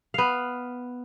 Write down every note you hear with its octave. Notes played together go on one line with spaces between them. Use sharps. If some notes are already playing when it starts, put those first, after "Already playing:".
B3 F5